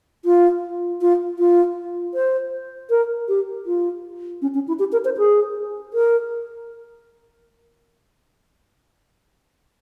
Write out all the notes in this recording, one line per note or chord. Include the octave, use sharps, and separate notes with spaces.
F4
F4
F4
C5
A#4
G4
F4
C#4
C#4
E4
G4
A#4
C5
G#4
A#4